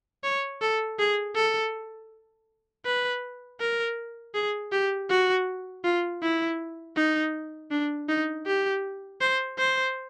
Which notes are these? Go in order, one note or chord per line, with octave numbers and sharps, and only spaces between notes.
C#5
A4
G#4
A4
B4
A#4
G#4
G4
F#4
F4
E4
D#4
D4
D#4
G4
C5
C5